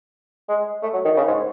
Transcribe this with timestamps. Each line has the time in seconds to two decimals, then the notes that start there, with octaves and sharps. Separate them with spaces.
0.49 G#3
0.83 A3
0.94 F#3
1.05 D#3
1.17 C#3
1.27 G#2